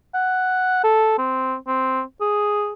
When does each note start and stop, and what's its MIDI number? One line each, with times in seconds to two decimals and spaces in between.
0.14 0.84 78
0.84 1.16 69
1.18 1.55 60
1.67 2.02 60
2.21 2.73 68